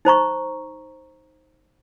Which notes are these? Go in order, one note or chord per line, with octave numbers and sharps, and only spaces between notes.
D#4 C5 A#5 C#6